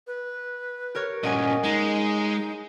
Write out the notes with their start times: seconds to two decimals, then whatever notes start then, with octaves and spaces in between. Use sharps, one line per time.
0.07 B4
0.95 G4 A#4 C#5
1.23 G2 A#2 C#4 D#5 F#5 G#5
1.63 G#3 D#4